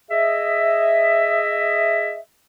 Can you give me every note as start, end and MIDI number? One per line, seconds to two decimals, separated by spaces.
0.10 2.18 68
0.10 2.18 75
0.10 2.18 76